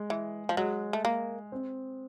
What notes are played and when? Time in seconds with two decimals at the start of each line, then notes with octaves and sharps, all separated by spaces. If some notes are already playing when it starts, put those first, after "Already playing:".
Already playing: G#3
0.10 E3
0.49 F3
0.57 F#3 G#3
0.93 A3
1.05 A#3
1.52 C4